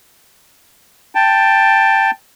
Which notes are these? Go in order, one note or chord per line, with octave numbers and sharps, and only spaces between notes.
G5 A5